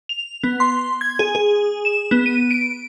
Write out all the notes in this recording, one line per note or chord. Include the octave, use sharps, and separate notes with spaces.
F7
B3
C6
G#6
G#4
G#4
E7
B3
D#7
D7